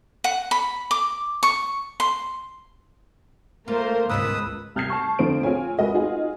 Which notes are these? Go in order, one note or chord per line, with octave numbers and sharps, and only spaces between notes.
F#5
B5
D6
C#6
C6
A3 A#3 F4 A#4 C5
C#2 G#2 B2 D#3 B4 D#6 E6
C2 F6 G6 G#6 C7
A5 C#6
F2 D3 F3 C5 D7
C4 F4 G#4 C#5 G#5
G#3 F#4 A#4 B4 D#5
D#4 F4 F#4 G#4